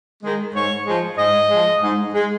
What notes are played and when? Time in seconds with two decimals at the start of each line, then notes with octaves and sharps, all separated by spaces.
0.23 D#3 G#3
0.55 G#2 C#5
0.86 F3 G#3
1.18 G#2 D#5
1.51 F3 G#3
1.82 G#2
2.14 G#3